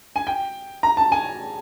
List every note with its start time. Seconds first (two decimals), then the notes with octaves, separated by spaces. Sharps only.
0.16 G#5
0.27 G5
0.83 A#5
0.97 A5
1.12 G#5